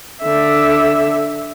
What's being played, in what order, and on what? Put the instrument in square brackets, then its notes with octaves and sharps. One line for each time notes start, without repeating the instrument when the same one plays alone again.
[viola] D3 E5